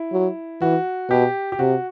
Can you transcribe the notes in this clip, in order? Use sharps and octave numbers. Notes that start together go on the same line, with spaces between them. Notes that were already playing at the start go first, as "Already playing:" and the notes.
Already playing: E4
F#3
E3 F#4
B2 G4
G4
C3 F#4